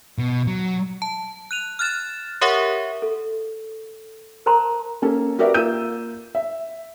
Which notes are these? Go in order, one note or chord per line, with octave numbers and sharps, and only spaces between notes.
B2
F#3
A5
F#6 D#7 F7
F6 F#6 A6 E7
G4 A#4 C#5 E5 F#5 C#6
A4
A#4 C5 A5 A#5 C6
A#3 C#4 A4
F#4 G4 A#4 B4 D5 E5
A#3 F4 E6 G6 D#7
E5